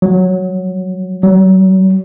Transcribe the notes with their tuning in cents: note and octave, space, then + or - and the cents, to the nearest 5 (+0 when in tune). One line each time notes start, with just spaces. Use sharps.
F#3 -5
F#3 +35